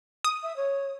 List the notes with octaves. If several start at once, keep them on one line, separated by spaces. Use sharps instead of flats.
D#6
E5
C#5